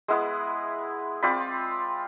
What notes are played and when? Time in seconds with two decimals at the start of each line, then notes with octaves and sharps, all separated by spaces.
0.08 G#3 B3 E4 B4
1.23 C4 F4 D5 B5